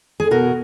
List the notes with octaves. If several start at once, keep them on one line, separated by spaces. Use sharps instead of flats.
G#4
B2 F#4 A#4